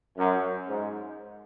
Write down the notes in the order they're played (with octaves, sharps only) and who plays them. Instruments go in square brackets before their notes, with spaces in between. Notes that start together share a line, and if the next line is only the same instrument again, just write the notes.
[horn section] F#2
G#2